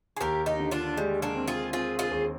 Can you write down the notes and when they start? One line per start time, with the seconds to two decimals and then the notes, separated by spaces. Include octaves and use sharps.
0.17 G#4
0.20 D#2 G4 A#4
0.46 D#4 G4
0.59 D3
0.71 D4 F4
0.97 G3 G#3
1.22 A#3 D4
1.35 C4
1.47 F4 G#4
1.73 C4 F4 G#4
1.99 F4 G#4
2.11 D#2